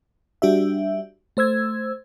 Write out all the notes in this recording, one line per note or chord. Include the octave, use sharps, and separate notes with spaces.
G3 D4 F#4 G4 E5
A3 C5 E6 G#6